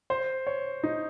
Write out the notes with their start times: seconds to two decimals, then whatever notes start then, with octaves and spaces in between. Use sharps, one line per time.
0.10 C5
0.47 C#5
0.83 D#4